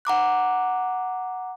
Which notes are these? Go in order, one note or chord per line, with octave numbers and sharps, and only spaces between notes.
F#5 A#5 D6 F#6